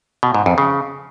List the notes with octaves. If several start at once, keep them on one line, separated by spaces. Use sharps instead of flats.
B2
G#2
F2
C#3